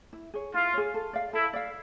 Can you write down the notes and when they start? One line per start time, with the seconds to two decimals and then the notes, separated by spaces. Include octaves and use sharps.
0.13 E4
0.34 G#4 C#5
0.54 E4 F4
0.73 G#4 C#5
0.94 A4
1.13 D5 F5
1.33 E4 A4
1.53 D5 F5